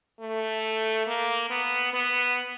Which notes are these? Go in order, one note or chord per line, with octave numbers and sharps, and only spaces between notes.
A3
A#3
B3
B3